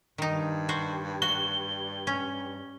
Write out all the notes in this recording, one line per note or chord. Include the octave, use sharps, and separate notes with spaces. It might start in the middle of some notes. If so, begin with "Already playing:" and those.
G2 D#3 D#4
F#4 C5
F#4 G7
C#4